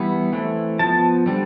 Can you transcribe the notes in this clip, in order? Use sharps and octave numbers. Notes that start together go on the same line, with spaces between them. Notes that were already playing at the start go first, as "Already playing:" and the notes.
Already playing: E3 G3 B3
E3 A3 C4
F3 B3 A5
D3 G3 C4